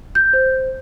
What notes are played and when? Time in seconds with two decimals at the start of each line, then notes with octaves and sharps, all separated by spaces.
0.15 G6
0.33 C5